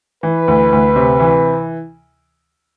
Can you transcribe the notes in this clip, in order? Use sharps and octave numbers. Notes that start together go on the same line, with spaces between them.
E3 B4
D2
D2
C3
E3